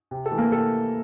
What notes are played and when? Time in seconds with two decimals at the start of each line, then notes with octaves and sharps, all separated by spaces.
0.11 C3
0.26 A4
0.31 E3 A3
0.38 A#3 A#4
0.51 C3 A4